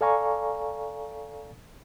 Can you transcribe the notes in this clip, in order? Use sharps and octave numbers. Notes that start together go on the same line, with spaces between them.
A4 D5 F5 G#5 A#5 C#6